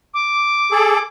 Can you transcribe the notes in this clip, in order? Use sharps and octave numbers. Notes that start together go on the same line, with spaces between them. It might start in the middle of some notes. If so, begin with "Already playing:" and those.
D6
G#4 A4